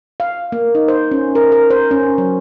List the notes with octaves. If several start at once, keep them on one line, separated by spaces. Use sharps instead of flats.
F5
A#3
D#4
C5
C#4
A#4
A#4
C5
C#4
F#3